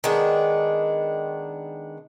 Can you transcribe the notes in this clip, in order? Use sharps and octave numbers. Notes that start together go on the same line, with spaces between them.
D#3 G#3 B3 D4